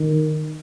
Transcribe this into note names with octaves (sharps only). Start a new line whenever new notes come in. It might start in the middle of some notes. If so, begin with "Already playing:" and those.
Already playing: D#3